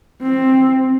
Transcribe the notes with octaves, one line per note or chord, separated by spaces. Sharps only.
C4